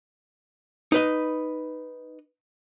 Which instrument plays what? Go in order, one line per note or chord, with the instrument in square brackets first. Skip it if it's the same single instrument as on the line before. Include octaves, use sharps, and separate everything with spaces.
[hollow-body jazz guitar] D#4 B4 D#5